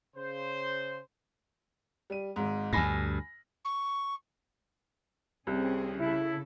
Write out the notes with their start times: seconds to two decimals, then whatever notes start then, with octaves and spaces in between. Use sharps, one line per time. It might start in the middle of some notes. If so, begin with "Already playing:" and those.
0.16 C#3 C5
2.10 G3 D#7
2.36 G#1 G#2
2.73 D2 G2 G#5 B5 A#6
3.64 C#6
5.47 C2 C4 C#4 G#4
6.00 C#3 E4 A4